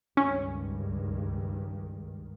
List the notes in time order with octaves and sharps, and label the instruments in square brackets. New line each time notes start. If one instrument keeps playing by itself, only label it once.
[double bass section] C#2 G2 D#3 [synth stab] C#4